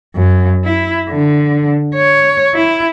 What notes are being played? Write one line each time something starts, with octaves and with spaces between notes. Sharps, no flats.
F#2
E4
D3
C#5
E4